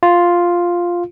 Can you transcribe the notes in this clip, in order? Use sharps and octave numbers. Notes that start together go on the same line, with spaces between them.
F4